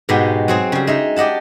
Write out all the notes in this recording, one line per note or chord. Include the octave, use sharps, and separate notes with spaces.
G#2 B2 G#3 B3 F#4 G4
F#3 C4 G#4
C#3 G3
G#3 D#4 E5
G4 D5 D#5 F#5 A5